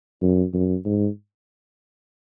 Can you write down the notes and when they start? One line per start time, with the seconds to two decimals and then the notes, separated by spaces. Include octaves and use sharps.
0.22 F#2
0.54 F#2
0.85 G#2